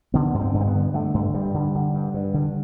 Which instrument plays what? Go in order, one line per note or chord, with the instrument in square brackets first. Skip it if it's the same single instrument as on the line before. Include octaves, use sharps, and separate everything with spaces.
[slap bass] D3 B3
G2
C4
G2
C4
B3
D3
D3 A3
G2
G2 G3
D3
D3
G2
G2
D3